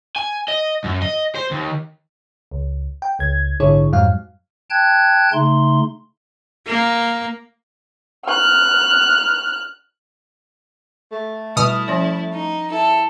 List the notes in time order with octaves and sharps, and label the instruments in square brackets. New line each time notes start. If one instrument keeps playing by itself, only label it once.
[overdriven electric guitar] G#5
D#5
F#2
D#5
C5
D#2
[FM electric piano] C#2
G5
C#2 G#6
A#1 G#2 D3 E4 G#4 C#5
F2 G#2 F#3 G3 F5
[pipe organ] G5 A5 F#6 G#6
C#3 A3 D#4 C6
[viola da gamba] A#3
[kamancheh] F6 F#6
[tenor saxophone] A3
[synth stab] B2 D#6 F6 [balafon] G3 [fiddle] E4
[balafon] F3 C#4 D5
[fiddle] D#4
[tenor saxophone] E4 [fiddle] A4